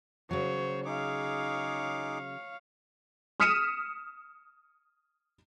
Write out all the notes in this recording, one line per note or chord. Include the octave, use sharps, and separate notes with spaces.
C#3 F#3 C5 C#5
D#4 G#4 C#5 F5 D6
D#6 F6 B6 C#7 D#7 E7